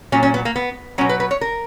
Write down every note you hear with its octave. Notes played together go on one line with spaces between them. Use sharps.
A#2 F#3 C#4
C#4
B3
A#3
B3
B2 F#3 C#4
B4
B4
C#5
A#4